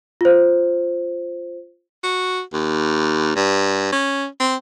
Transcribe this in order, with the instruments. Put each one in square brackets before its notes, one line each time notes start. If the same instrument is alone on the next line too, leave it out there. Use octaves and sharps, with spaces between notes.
[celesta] F4 C5
[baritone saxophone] F#4
D#2
G2
C#4
C4